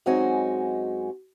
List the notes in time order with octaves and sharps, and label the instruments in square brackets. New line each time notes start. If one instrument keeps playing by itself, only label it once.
[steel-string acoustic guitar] F#2 G#3 C4 D#4 F#4 G#5